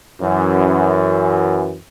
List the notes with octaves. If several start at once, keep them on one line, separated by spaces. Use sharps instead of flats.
F#2 E3